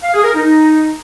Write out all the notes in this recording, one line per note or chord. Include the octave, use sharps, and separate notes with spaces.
F5
G#4
A#4
D#4